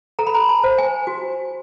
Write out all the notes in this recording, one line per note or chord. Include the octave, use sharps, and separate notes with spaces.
A4 A#5
B5
A#5
A5
C5
G#5
F#4